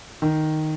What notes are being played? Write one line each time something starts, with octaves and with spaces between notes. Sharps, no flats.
D#3